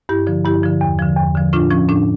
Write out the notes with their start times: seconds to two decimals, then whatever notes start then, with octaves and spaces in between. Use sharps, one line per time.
0.09 G2 E4 G4
0.27 D3 F3
0.45 G2 E4 G4
0.63 D3 F3
0.81 E2
0.99 D3 F3
1.17 E2
1.35 D3 F3
1.53 A2 D4 F4
1.71 F3 C#4
1.89 A2 D4